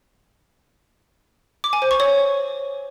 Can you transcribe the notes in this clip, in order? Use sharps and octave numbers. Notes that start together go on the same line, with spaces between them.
D6
G#5
C5
C#6
C#5